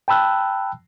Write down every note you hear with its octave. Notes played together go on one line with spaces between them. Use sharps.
G5 A5 B5 E6 F#6